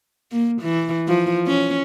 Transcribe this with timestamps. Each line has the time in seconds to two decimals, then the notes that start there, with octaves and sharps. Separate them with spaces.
0.32 A#3
0.61 E3
1.08 F3
1.47 C#4